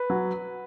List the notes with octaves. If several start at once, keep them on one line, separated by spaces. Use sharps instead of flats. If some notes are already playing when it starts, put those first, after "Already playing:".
Already playing: B4
F#3